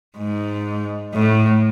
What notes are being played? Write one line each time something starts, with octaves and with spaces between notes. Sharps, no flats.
G#2
A2